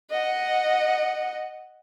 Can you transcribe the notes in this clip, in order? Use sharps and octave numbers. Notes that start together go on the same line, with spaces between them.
D#5 F#5